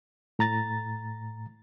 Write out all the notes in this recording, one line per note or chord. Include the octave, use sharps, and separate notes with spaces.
A2 A#5 A6